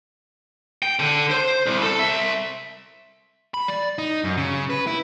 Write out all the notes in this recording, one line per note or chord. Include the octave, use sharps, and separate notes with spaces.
G5
D3
C5
C2
A4 A5
C2 E5
B5
D5
D#4
F#2
C#3
B4
E4